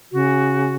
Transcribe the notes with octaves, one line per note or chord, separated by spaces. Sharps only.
C#3 F#4